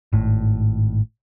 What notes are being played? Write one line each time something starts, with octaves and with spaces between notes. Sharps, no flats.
G#1 A2